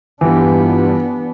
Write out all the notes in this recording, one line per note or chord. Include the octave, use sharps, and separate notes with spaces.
G2 E3 B3 D4 F4 G4